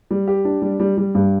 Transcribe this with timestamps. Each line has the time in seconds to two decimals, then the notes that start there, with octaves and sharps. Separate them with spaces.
0.11 G3
0.28 G4
0.45 D4
0.62 G3
0.80 G3
0.97 G3
1.15 G2